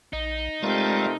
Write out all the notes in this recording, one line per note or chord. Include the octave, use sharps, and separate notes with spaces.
A#1 D#4
C3 G#3 A3 F4 A#4 D5 A5